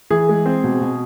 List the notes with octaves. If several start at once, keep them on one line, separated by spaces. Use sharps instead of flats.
E3 G#4
G#3
C4
B2
B2